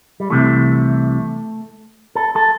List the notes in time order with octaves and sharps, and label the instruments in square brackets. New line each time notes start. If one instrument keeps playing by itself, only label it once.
[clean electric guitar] G3
C2 C3 E3 A3
A4
A4